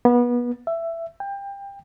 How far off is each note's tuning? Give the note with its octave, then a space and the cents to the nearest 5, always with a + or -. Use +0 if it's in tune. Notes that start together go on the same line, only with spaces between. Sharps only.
B3 -25
E5 +15
G5 +25